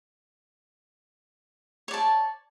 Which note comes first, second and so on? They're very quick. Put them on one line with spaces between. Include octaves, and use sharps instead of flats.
C#5 D5 A5